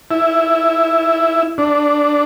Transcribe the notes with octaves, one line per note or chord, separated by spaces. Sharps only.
E4
D4